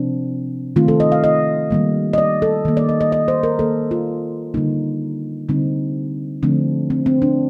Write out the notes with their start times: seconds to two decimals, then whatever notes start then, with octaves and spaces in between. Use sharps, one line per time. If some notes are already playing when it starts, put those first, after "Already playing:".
Already playing: C3 F3 C4 D4
0.76 D#3 A3 C4 F4
0.88 A4
1.00 D#5
1.12 F5
1.24 D#5
1.71 D#3 G3 A#3
2.13 D#5
2.18 D5
2.42 A4
2.65 D#3 A#3
2.77 D5
2.89 D#5
3.01 D#5
3.12 D#5
3.28 C5
3.43 A#4
3.59 D#3 A#3 A4
3.91 F4
4.54 D3 G3 A#3 D#4
5.49 D3 G3 C4 D#4
6.43 D3 F3 A3 C4 D4
6.90 C4
7.06 C4
7.22 D4